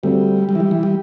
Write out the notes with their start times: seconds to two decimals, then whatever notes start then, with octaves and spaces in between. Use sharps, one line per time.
0.03 D2 D3 G3 C4
0.49 G3
0.55 E3
0.60 G3
0.71 E3
0.83 G3